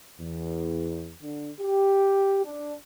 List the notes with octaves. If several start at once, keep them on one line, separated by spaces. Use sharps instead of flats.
E2
D3
G4
D4